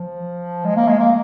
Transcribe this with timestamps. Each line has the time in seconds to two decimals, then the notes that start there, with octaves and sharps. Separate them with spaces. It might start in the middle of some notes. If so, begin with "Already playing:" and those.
Already playing: F3
0.65 G#3
0.76 A#3
0.88 G#3
0.99 A#3